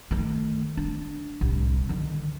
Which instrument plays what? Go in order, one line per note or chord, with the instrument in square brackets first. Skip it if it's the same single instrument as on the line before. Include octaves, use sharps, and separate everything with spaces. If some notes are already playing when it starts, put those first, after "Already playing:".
[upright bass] D#3 A3
D4
D1 C2
D3 D#3